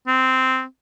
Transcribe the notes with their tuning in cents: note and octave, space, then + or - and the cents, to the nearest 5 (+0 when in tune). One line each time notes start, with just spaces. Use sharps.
C4 -10